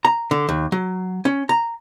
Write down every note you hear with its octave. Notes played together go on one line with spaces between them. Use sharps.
A#5
D3
D#2
F#3
C#4
A#5